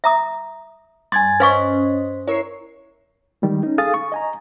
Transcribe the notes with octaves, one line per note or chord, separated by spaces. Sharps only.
E5 A#5 D#6
G2 G#5 C6 G#6 A6
C#4 B4 C5 D#5 F5 C#6 B6
E4 A#4 C#5 C7
D#3 G3 G#3
C#4 D#4
G#4 A4 F5 G#5 D#6 A6
C#6
D#5 G#5 A#5